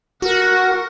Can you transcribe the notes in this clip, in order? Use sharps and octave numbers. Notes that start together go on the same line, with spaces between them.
F#4 A#4 F#5